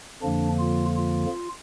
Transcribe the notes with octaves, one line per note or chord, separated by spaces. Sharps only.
F2 D3 F3 A#3 D4
F4
F4